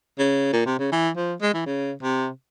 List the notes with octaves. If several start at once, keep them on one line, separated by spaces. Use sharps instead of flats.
C#3
A#2
C3
C#3
E3
F3
G#3
E3
C#3
C3